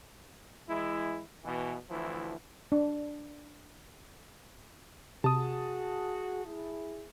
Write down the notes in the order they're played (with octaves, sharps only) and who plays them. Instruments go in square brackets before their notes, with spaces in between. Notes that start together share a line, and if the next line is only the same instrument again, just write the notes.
[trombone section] E3 G#3 E4
B2 E3
D2 E3 F3 E4
[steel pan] D4
[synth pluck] C3 [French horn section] F#4 G#4 [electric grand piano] A5 D#6
[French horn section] E4 G#4